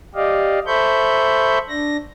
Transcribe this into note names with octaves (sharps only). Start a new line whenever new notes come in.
G4 D5 D#5 F5
A4 C5 E5 B5 C#6 G6
D4 A#6